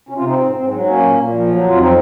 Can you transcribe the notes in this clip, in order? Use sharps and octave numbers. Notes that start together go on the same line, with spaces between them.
C3 C#4
F4
C4 D#4
G#2
G#2 C4
F#3
A#3 C#4
A#2
A#2
F3
F#3
F2 F4
C4 D#4